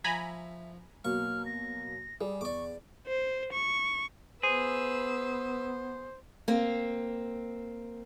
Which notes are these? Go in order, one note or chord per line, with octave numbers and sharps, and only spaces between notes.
F3 E5 G#5 A#5 B5
B2 F#3 A#3 C#6 F6
A#6
G3 G#4
E2 D5 C#6 D6
C5
C#6
B3 G#4 B4 C5 E6
A#3 C4